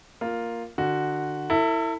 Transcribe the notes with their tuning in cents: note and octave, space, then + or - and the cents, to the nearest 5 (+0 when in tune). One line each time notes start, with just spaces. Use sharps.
A#3 +0 F4 +0
D3 +25 F#4 +0
E4 +0 A4 +45